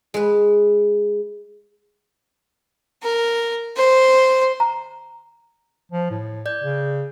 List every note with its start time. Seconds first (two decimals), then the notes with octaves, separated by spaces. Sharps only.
0.14 G#3 B4
3.03 A#4
3.76 C5
4.60 A#5
5.92 F3
6.11 A2
6.46 D5 G6
6.63 C#3